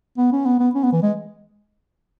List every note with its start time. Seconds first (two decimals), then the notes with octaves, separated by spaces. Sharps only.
0.18 B3
0.32 C#4
0.45 B3
0.60 B3
0.75 C#4
0.83 B3
0.93 E3
1.02 G#3